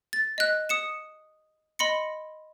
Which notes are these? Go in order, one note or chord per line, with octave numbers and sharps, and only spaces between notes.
A6
D#5 F#6
D#6 C#7 E7
D#5 B5 C6 A#6 C#7